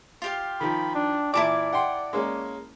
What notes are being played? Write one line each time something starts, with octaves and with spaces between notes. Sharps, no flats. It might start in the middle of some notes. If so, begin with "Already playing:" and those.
F4 G4 F5
D#3 F3 B5
D4
A#2 E3 E4 D5 A5 D6
F#5 G5 C6
G#3 A#3 C#4